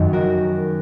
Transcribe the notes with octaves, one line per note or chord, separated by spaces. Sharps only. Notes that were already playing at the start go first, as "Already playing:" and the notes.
Already playing: F#2 D#3 F#3
F#4 A#4